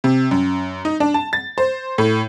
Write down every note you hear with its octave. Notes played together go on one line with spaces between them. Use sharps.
C3
F#2
D#4
D4
A5
A6
C5
A2